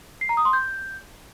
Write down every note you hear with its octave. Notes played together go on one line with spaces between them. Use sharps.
C7
A#5
D#6
C6
G6